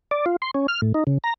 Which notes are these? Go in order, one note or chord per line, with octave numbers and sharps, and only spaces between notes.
D5
F4
C6
C#4
F6
A2
D#4
C#3
A#5